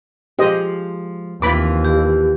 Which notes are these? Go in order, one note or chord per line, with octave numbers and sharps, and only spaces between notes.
F3 G#3 G4 C5 D#5
D#2 E3 C4 F4 B5 D6
G4